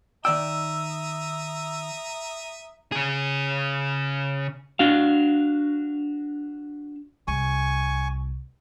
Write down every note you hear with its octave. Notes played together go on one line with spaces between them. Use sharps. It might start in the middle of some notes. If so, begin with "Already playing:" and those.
D#3 D5 E5 G5 A#5 D#6 E6
C#3 G#4
D4 F#4 F5
C2 G#5 C#6